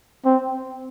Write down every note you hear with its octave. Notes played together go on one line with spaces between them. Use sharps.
C4